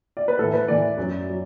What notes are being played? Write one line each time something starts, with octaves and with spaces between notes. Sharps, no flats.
D5
B4
A2 E3 A4
B4
A2 E3 D5
F#2 F#3
F#3